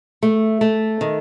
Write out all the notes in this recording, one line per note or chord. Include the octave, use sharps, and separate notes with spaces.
A3
A3
D#3